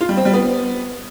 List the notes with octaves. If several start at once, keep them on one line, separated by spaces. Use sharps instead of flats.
F4
G3
C4
G3
B3